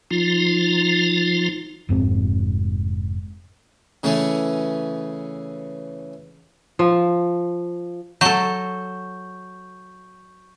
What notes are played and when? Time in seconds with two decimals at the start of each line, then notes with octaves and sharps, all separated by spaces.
0.11 F3 D#4 F4
1.89 F1 G#2 C4
4.03 C#3 E3 A3 C#4
6.79 F3
8.21 F#3 A4 C#6 G6